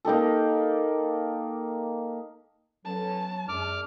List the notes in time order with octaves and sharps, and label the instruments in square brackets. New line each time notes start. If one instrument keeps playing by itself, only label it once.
[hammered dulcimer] A#3 D#4 G4 A4
[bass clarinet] F#3 [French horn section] B3 C#4 A4 [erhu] A5
[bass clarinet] F#2 [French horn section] G#3 D4 [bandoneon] D6 F6